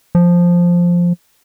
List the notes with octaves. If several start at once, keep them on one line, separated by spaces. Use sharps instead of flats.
F3